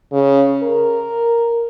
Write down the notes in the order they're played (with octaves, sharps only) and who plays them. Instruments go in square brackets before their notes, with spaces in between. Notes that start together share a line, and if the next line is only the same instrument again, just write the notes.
[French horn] C#3
A#4